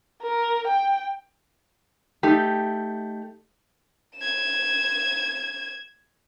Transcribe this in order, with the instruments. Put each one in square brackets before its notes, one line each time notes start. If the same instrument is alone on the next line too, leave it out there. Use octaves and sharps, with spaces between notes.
[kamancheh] A#4
G5
[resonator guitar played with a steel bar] A3 D#4 G4
[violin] G#6 E7